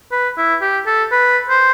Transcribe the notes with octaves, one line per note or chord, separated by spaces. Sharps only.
B4
E4
G4
A4
B4
C5